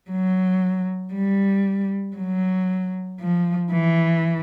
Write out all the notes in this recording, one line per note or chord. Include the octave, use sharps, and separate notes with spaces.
F#3
G3
F#3
F3
E3